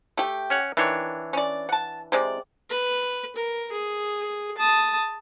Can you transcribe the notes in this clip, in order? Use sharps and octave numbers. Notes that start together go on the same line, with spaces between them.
A3 G4
C#4 C#5 F#5
D#3 E3 D4 C#5
C#4 D5
F#5 A5
C3 G#3 D5
B4
A#4
G#4
A5 D#6